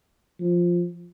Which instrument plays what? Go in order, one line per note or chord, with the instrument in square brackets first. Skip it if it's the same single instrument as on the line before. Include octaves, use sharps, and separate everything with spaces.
[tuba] F3